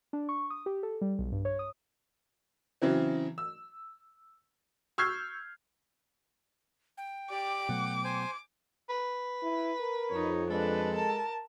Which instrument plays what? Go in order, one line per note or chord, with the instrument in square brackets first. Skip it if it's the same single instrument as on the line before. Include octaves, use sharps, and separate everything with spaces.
[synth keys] D4
C#6
D#6
G4
A4
G3
B1
G2
C#5
D#6
[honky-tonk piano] C#3 E3 F#3 C4
E6
C#6 E6 F6 G6 G#6 C7
[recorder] G5
[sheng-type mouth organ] G4 D5 [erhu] D6
[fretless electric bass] B2 F#3 A3 [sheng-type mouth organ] F#5
[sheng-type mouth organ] C5 G#5
[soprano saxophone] B4
[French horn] E4
A#4
[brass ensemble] F2 [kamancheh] D#4 C#5
[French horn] G#3 [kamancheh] D4 B4 [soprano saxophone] A4
[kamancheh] A#4 A5